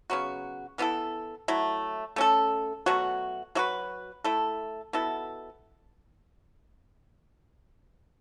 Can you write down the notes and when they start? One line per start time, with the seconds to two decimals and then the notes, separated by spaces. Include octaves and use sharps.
0.10 C#3 F#3 B3 F#4
0.78 E3 B3 E4 A4
1.48 F#3 A3 E4
2.16 A3 C#4 A4
2.86 B2 F#3 A3 F#4
3.55 F#3 A3 F#4 B4
4.24 A3 E4 A4
4.93 B2 B3 E4 A4